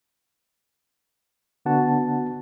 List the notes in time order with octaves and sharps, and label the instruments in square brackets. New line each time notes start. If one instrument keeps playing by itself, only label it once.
[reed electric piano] D3 B3 D4 F#4 F#5 A5